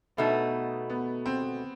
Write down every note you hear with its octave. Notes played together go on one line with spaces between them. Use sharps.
B2 A3 B3 D#4
B3
C4